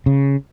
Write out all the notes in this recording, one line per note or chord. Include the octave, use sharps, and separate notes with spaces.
C#3